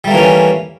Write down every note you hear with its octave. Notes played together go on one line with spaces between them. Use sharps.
E3 G3 A3 A#3 C#4